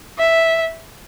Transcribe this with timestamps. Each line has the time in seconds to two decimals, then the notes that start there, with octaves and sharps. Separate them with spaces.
0.19 E5